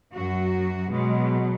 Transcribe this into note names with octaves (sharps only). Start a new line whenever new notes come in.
F#2 F#3 F#4
B2 F#3 G#3